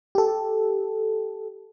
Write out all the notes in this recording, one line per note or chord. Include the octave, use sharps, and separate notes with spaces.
G4 A4